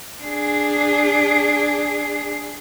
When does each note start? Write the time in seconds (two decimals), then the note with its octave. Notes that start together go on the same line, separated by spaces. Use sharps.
0.23 D4 G#4